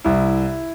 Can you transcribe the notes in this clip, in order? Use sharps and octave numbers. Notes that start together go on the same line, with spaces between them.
C2 E4